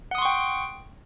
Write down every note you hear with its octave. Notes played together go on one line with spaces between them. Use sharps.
F#5 G5 C6 C#6 D#6